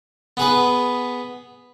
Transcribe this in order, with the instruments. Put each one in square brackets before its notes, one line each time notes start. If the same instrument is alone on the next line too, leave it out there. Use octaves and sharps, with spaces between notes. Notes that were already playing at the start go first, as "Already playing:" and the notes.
[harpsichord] B3 G#4 B4